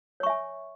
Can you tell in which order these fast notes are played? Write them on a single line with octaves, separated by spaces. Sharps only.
C#5 C#6 E5 G#5